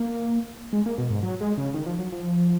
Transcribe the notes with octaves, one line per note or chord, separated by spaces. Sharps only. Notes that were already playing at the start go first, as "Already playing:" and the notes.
Already playing: A#3
G#3
A#3
B2
G#2
F#3
G#3
C#3
D#3
F3
F#3
F3